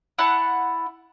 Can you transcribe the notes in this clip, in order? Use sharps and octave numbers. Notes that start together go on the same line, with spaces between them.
E4 F#5 A5